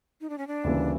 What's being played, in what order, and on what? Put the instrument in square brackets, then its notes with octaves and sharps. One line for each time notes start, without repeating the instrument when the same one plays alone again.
[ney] D#4
D4
C#4
D4
[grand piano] D2 C#3 E3 G3 A#3